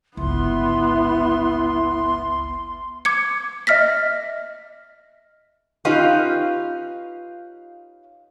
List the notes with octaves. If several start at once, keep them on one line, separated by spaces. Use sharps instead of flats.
G1 C#2 B3 E4 C6
D6 G#6 C#7
D#5 E5 F6 A#6 B6
C#4 D#4 F4 G4 B4